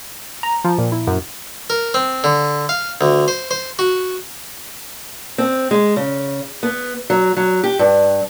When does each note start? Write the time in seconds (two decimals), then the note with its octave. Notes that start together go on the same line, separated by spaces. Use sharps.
0.43 A#5
0.64 F3
0.78 A#2
0.92 E4
1.07 F#2
1.70 A#4
1.94 C4
2.24 D3
2.69 F5
3.01 D2
3.28 C5
3.51 C5
3.79 F#4
5.38 C4
5.71 G#3
5.96 C#3
6.63 B3
7.10 F#3
7.37 F#3
7.64 G4
7.79 G2